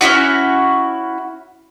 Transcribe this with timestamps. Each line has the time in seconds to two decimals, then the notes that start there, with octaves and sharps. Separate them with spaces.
0.01 C#4 D#4 E4 F#4